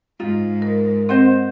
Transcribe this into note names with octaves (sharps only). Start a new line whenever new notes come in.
G#2 D#4 F4
A#4
C4 C5 D#5 F#5